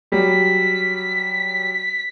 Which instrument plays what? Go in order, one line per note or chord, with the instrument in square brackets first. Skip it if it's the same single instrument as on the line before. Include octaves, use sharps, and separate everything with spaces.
[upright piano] F#3 G3 [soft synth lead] B6